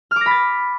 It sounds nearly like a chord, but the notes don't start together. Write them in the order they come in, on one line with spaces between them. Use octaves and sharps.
F6 D6 A#6 B5 A6